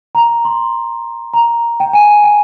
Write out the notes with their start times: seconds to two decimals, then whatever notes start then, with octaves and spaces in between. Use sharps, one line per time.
0.15 A#5
0.45 C6
1.34 A#5
1.80 G5
1.93 G#5
2.24 G5